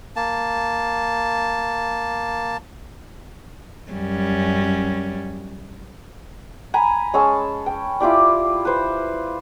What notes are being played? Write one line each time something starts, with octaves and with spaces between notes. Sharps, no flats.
A#3 A5
F#2 G3 C#4
G#5 A#5 B5
G#3 C#4 A5 E6
G5
E4 F4 G4 D5
B4 C5